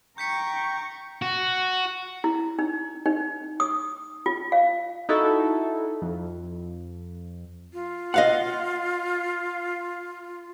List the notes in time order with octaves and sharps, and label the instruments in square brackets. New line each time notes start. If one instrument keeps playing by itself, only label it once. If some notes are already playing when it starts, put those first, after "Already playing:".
[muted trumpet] G5 [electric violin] A#5 C#6 [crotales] G6 B6 C#7
[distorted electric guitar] F#4
[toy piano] E4
D#4
D#4
D#6
F4
F5
[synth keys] D#4 E4 F#4 A4
F2
[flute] F4
[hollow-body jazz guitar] D#5 F5 F#5